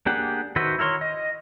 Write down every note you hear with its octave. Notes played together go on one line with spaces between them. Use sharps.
A#3 D4 G4 G#4 F#5
D#3 F#4 B4 C5 E5
E4 A#4 C#5 C6
D#5